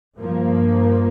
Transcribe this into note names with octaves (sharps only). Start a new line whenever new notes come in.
G2 F3 A#3